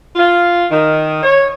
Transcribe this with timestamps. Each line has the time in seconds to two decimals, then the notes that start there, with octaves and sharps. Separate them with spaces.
0.15 F4
0.70 D#3
1.22 C#5